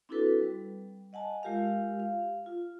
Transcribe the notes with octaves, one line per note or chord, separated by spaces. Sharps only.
C4 D4 E4 F#4 A4 B4
G3
D#5 F#5 G#5 A5
G#3 F4 G4 A#4 F5
F5
F4